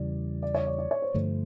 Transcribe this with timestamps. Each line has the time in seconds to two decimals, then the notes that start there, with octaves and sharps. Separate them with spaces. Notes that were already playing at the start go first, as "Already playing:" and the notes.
Already playing: E2 C#3 E3 G3 D5
0.42 D5
0.55 C#5
0.67 D5
0.78 D5
0.91 C#5
1.02 C5
1.14 G2 D3 F3 A3